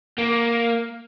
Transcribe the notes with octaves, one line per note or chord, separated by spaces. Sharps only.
A#3